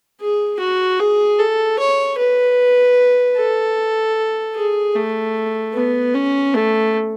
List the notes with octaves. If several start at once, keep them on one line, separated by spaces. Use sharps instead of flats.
G#4
F#4
G#4
A4
C#5
B4
A4
G#4
A3
B3
C#4
A3